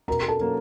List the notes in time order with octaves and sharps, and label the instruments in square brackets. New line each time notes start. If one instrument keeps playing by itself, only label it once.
[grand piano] B2 [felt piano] A#4 A#5
[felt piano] A4 A5
[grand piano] F#3 A#3 C#4